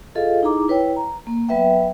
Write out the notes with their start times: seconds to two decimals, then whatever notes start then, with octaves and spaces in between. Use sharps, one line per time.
0.15 F4 G#4 A4 D#5 F5
0.43 D#4 E4 G#4 A#5 D6
0.68 E4 B4 C#5 G5
0.96 A#5
1.27 A#3
1.49 F#3 B3 B4 E5 G5